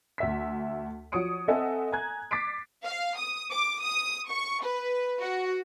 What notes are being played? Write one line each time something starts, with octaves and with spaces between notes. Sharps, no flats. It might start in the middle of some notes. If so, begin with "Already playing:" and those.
D2 E5 B6
F3 F#4 C#5 D#6 C#7 D7
C4 A4 D#5 E5 F#5 G#5
G#5 A#5 F#6 G#6
D6 A6 B6 C7 D7
F5
D#6
D6
D#6
C#6
B4
F#4